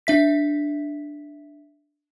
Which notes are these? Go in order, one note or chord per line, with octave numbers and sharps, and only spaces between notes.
D4 E5 B6